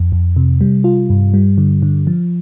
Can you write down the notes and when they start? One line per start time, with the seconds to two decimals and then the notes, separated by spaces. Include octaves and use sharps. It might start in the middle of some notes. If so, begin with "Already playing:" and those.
Already playing: F2
0.12 F2
0.36 C3
0.61 G3
0.84 F4
1.10 G2
1.34 G3
1.58 D3
1.82 D3
2.07 F3